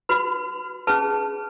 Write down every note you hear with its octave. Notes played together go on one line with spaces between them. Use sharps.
F#4 B4 B5
C#4 G#4 B4 A5